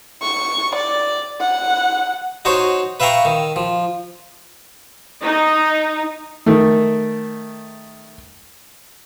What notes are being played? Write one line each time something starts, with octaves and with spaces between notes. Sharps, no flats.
C#6
D5
F#5
D#4 F#4 C5 C#5
B4 E5 F5 G5 A#5 C#6
D#3
F3
D#4
D#3 A3